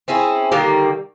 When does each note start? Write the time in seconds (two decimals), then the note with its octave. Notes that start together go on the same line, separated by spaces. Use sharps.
0.08 C4 C#4 E4 G#4
0.52 D3 D#3 G3 A#3